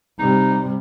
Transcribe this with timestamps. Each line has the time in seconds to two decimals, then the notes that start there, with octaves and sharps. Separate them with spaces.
0.19 C3 G3 D#4